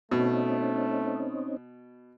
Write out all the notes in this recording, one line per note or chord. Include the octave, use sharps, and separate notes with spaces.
B2 A3 C4 C#4 D#4